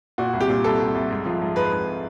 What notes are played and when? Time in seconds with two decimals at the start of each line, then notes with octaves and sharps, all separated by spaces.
0.18 A#2 F#4
0.33 C2
0.40 G4
0.49 A#2
0.64 C2 A4
0.80 C2
0.95 C2
1.10 G#2
1.25 F3
1.41 G#2
1.56 G#2 B4
1.72 G#2